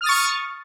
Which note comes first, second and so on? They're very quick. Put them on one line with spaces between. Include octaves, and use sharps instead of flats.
F6 D#6 A6 C#6